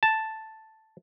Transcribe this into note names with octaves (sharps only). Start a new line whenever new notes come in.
A5